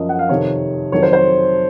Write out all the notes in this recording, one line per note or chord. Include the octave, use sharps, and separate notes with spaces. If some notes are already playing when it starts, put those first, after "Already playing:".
Already playing: F#2 F3 D#5
F#5
F5
F2 C3 D#3 C#5
F2 D#3 F#3 C#5
C5
C5